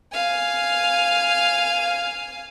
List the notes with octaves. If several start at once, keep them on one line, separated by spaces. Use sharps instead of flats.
F5 G#5